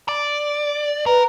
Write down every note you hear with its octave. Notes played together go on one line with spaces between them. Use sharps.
D5
A#4 B4